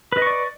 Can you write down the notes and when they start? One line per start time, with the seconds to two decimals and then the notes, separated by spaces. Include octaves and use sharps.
0.12 B4
0.17 D#5
0.22 C#6
0.27 D5